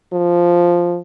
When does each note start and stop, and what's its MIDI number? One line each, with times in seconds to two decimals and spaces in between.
0.13 0.98 53